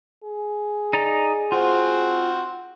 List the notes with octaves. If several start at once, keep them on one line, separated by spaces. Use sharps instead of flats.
G#4
D#4 D5 A#5
C4 F4 F#4 C5